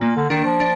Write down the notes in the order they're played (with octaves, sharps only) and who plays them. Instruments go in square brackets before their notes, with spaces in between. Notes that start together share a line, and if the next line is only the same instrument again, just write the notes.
[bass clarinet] A#2 [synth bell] A#3
[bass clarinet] D3
[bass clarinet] D#3 [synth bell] D4
[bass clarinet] F3
[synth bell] D4